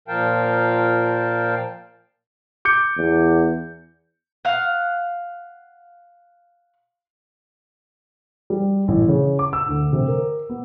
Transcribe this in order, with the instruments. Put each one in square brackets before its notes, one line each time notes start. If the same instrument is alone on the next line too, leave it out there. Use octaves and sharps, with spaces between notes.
[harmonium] A#2 F3 A#4 F5 G5 A5
[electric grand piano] D6 G6 C#7
[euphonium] E2
[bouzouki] F5 F#5
[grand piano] G3
A1
C#3
D6
E6
D2
C3
A#4
B3